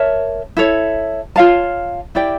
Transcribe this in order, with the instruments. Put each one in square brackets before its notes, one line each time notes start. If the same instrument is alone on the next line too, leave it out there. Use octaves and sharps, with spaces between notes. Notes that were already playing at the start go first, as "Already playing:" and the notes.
Already playing: [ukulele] A#4 C#5 E5 A5
E4 A4 C#5
F4 C#5 F5 A5
E4 G4 D5 G5